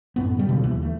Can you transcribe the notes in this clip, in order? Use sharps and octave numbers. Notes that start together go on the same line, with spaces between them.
F#2 A2 B3
C#3 G3
B2 D3 F3
D#2 E3
A3